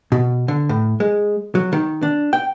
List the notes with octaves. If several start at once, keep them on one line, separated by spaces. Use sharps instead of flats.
B2
D3
A2
G#3
F#3
D#3
D4
G5